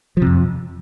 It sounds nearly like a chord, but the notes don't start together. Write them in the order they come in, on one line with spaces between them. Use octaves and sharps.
F3 C3 F2